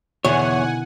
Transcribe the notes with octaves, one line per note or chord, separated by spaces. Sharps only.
E2 B2 D3 D#3 C#5 F#5 G#5